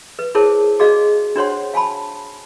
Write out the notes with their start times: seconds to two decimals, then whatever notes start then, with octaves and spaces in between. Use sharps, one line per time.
0.19 B4
0.35 E4 G#4 A#4 C5 C#5 A5
0.79 F#4 G#4 D5 D#5 F5
1.36 D4 F#4 C5 C#5 F#5 C6
1.74 F5 G#5 A5 B5